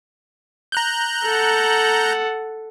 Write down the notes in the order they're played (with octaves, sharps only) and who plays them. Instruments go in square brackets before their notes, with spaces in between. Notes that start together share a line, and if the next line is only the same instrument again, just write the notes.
[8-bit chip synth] A#5 F#6 G6
[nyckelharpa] A4 F#5